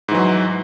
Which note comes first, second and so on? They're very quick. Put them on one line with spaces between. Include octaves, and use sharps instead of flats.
G#2 E3 F#3